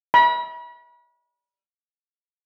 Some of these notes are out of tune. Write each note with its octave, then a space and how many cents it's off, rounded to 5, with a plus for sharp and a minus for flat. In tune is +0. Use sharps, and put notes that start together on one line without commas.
B5 -35